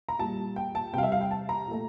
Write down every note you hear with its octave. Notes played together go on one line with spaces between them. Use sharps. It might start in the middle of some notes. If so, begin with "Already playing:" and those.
A#5
A#2 G3 A5
G5
A5
C3 G3 F5 G5
E5
F5
G5
A5
A#5
A#2 A3